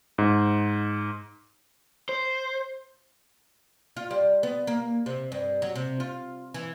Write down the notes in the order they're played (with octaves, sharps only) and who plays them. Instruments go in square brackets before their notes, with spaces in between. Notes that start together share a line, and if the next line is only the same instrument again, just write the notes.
[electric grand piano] G#2
[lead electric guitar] C5
[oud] F4
G3
B3
A#3
C3
G2
F#3
C3
F4
E3